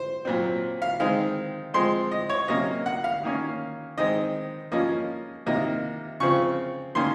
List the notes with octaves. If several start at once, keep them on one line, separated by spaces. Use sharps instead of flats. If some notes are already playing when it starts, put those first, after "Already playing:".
Already playing: C5
A#2 F#3 C4
F5
D#3 G#3 C4 F5
F3 G#3 C4 C6
D#5
C#5
C3 F#3 A#3 C#4 D#5
F#5
F5
D#3 A#3 C#4
D#3 G#3 C4 D#5
F3 A#3 C#4 D#5
C3 D#3 A#3 D#5
C#3 F3 C4 C#6
D#3 A#3 C#4 C6